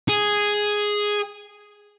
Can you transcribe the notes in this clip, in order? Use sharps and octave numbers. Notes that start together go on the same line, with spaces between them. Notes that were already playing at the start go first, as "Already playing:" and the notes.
G#4